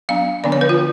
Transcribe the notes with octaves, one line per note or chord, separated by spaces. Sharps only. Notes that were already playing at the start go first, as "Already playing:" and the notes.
F#3 B3 D4 F5
D3 F3 B3 D4 D5
C#5
B4
F4